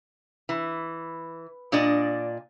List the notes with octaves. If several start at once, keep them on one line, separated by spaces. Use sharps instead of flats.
E3
A#2 D4 D5 D#5